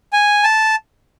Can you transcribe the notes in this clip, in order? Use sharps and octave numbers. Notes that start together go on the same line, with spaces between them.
G#5
A5